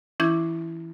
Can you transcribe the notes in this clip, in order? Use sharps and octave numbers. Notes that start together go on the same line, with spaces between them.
E3 C#4 E4 D6 G6 G#6